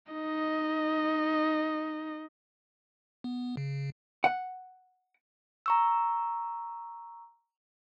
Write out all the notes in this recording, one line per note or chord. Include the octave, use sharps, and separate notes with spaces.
D#4 D#5
B3
C#3
F#5
A#5 C#6 E6